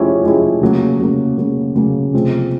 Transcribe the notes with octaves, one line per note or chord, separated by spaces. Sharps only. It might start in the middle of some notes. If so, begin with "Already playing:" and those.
Already playing: F3 G#3 C#4 E4 G4
F3 G#3 C#4 E4 G4
C#3 F#3 A#3
C#3 F#3 A#3
C#3 F#3 A#3
C#3 F#3 A#3
C3 F3 G#3 C4